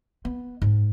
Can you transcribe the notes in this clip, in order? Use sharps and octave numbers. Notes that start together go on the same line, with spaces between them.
B3
G#2